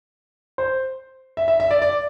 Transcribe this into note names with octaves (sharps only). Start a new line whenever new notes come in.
C5
E5
E5
E5
D5
D5